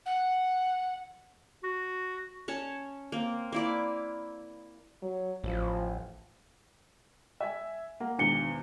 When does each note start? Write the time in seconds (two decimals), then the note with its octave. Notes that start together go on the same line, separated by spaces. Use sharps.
0.06 F#5
1.64 F#4
2.48 C#4 C#5 A5
3.12 A#3 C4
3.52 A#3 E4 D5
5.02 F#3
5.44 A1 F3
7.40 E5 G#5
8.00 A#3 F#5
8.19 G#1 E2 B2 D4 C#7 G7